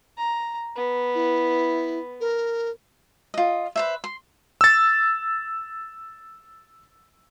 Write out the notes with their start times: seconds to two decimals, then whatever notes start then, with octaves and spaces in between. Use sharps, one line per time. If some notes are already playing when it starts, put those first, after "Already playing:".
0.18 A#5
0.76 B3
1.15 E4
2.21 A#4
3.34 F4 D#5
3.76 B4 C5 E5
4.04 C6
4.61 E6 A6